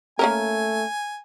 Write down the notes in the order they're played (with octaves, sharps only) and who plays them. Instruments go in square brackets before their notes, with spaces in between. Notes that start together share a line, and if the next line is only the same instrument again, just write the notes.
[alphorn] A3 [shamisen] A#3 C#4 A#4 [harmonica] G#5